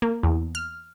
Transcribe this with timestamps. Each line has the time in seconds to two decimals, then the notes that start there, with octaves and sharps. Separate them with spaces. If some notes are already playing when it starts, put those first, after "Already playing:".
0.02 A#3
0.23 E2
0.55 F6